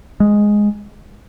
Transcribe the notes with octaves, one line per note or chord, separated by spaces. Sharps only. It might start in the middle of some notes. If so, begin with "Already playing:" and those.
G#3